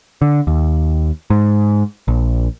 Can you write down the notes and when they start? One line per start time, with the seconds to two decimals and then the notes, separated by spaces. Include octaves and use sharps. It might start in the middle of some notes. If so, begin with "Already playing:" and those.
0.22 D3
0.47 D#2
1.30 G#2
2.08 A#1